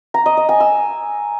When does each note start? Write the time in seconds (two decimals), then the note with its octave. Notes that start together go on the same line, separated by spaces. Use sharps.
0.14 A#5
0.26 D#5
0.37 D#5
0.49 G#5
0.60 E6